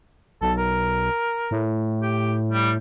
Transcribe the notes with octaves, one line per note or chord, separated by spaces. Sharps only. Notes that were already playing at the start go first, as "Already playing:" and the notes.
B1 A4
A#4
A2
G4
G3